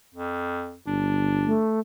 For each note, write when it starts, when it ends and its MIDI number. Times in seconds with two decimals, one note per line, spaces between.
0.14 0.76 41
0.87 1.51 31
0.87 1.66 62
1.45 1.80 57